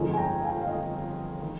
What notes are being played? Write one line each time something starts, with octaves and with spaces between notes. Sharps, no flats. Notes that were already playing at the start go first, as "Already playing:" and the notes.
Already playing: G1 F2 D#3 G#3
G#5
G5 A#5
F5 G#5
F5
D#5 G5
D#3